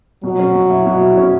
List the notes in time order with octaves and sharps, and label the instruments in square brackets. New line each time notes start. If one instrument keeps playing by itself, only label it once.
[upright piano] B2 [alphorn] F#3
[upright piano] C#4
B2
E4
B2
E4
C#4